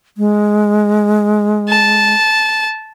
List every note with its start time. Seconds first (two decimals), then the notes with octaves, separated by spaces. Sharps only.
0.18 G#3
1.69 A5